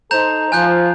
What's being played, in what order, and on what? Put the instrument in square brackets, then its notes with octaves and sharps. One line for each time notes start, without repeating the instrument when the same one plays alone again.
[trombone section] D#4 A4 C5 [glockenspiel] A#5 G6 F7
[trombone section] F3 [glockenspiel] G#5 F#6 G6